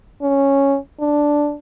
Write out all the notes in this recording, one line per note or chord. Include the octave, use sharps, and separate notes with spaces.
C#4
D4